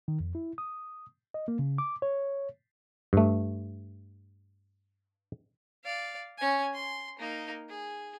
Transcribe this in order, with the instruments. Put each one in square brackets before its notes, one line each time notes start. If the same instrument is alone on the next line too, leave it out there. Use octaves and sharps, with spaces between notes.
[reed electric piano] D#3
F2
E4
D#6
D#5
A#3
C#3
D6
C#5
[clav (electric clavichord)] G2 A3
[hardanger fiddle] D5 F5
C#4 G#5
C6
A#3 D#4
G#4